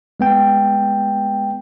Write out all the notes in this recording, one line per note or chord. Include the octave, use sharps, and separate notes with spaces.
G#3 B3 G5